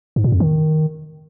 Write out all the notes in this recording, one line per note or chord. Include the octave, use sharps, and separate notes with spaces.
G#2
A#2
F2
D#3